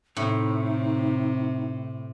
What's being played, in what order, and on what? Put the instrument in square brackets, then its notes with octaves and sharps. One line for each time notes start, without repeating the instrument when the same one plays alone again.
[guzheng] A2 [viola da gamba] C3 [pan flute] D#4